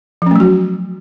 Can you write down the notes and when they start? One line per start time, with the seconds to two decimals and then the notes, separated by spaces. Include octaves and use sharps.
0.22 F3
0.26 C#4
0.31 A3
0.36 F#3
0.40 F#4